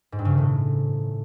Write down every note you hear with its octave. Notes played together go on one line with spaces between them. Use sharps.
G#2
G2
C#3
D#3
A2